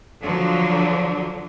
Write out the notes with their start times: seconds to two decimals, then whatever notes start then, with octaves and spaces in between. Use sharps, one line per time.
0.21 D3 F3 F#3